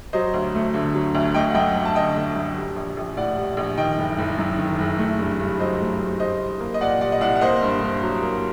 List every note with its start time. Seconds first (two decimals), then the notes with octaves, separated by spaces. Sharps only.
0.13 F#3 C5 D#5
0.34 D2
0.55 A3
0.74 D3
0.94 F#3
1.15 D2
1.34 A3 D#5 G5
1.51 F#5
1.55 F#2 D#5 G5
1.76 F#2
1.85 A5
1.95 D3 D#5 G5
2.15 A3
2.36 F#2
2.56 G3
2.76 A#1
2.97 A#1
3.17 A2 D5 F#5
3.37 G3
3.57 A#1
3.77 D#3 D#5 G5
3.98 F#1
4.18 F#1
4.38 F#2
4.58 D#3
4.79 F#1
4.99 A3
5.19 G2
5.39 G2
5.59 F#3 C5 D#5
5.80 A3
6.01 G2
6.20 G3 C5 D#5
6.41 C2
6.60 A#3
6.74 D#5
6.81 A#2 D5 F#5
7.01 G3 D5 F#5
7.12 D#5
7.21 C2 D5 F#5
7.36 F#5
7.41 A#3 C5 D#5
7.62 G2
7.82 G2
8.02 F#3
8.22 A#3